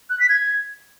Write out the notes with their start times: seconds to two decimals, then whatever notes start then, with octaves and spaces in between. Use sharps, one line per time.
0.10 F#6
0.20 B6
0.29 G#6